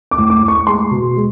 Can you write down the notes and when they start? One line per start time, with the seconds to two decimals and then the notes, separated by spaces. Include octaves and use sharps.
0.11 D6
0.18 A2
0.30 D6
0.42 A2
0.48 C#6
0.67 G#3 C6
0.91 B2
1.16 G#3